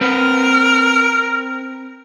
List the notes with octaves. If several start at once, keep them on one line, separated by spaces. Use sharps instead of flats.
C4 A#4 B4